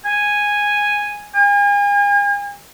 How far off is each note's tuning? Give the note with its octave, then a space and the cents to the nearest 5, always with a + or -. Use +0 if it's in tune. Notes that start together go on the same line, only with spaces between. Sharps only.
G#5 -5
G#5 -40